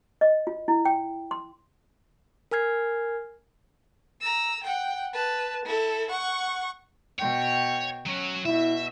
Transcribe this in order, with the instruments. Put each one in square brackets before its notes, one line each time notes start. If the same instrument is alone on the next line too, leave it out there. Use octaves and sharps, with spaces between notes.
[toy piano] D#5
F4
E4
G5
C6
[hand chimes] A#4 G#5 F6 G#6 C7
[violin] A#5 E6
F#5 G5
B4 A5
E4 A4
F#5 C#6
[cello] B2 G5 [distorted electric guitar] C#5
[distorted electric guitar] F#3 [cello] C#4
[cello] B2 [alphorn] E4 [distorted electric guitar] E5